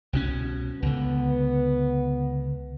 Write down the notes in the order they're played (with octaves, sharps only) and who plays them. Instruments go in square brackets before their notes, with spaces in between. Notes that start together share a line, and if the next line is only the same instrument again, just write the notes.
[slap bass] C2 B2 C#4
[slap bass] C#2 D3 [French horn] B3